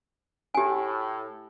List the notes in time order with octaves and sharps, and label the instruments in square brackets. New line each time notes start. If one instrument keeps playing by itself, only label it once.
[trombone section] A2 [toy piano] G4 G#5